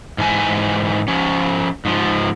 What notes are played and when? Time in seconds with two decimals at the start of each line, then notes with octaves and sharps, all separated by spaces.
0.18 G#2 E3 G#5
1.08 F3 C#4
1.85 G#2 F3